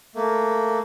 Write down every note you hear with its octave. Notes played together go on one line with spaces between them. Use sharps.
A3 A#3